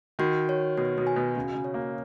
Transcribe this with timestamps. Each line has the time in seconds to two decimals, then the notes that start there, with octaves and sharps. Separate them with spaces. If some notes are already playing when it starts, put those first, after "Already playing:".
0.19 D#3 F#4
0.49 C#5
0.77 B2 F#4
0.98 B2
1.07 G#5
1.16 B2
1.35 C#3 F#4
1.55 C#3
1.64 C#5
1.74 A#3